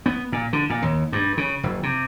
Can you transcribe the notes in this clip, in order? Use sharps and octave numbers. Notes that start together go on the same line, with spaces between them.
B3
A#2
D3
A#2
D#2
G2
C#3
F#1
C3